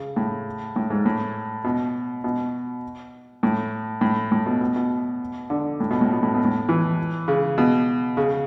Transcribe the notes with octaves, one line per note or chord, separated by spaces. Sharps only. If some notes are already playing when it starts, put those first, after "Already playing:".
Already playing: C#3
A2
A2
G#2
A2
B2
B2
A2
A2
A2
B2
B2
B2
D3
A2
B2
A2
B2
A2
B2
A2
E3
C#3
B2
C#3